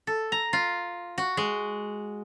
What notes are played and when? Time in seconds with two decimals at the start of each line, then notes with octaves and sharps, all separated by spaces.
0.07 A4
0.32 A#5
0.53 F4
1.18 F#4
1.37 G#3